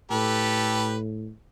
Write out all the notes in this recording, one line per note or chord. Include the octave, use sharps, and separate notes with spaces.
A2 G4 A4 B4